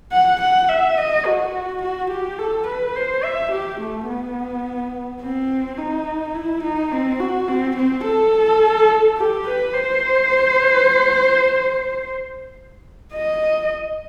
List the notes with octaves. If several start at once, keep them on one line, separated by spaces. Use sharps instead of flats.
F#5
F#5
E5
D#5
F#4
F#4
G4
A4
B4
C5
E5
G4
A3
B3
C4
D#4
E4
D#4
C4
F#4
C4
C4
A4
G4
B4
C5
D#5